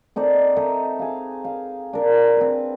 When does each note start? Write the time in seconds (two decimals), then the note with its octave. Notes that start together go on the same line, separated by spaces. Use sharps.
0.16 C4 D#4 A4 D5
0.56 D#4 A4 E5 A#5
0.99 G#4 F5
1.44 F5
1.93 D4 A#4
2.37 C4 B4